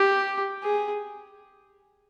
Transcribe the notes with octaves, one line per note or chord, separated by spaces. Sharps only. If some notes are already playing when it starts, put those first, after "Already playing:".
Already playing: G4
G#4